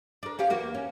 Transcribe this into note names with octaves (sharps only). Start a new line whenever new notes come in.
D4 A#4
C#4 G4 F5
E2 A#3 F#4
C#4